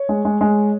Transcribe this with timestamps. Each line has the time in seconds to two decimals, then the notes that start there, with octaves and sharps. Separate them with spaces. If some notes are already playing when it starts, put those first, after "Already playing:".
Already playing: C#5
0.09 G#3
0.25 G#3
0.41 G#3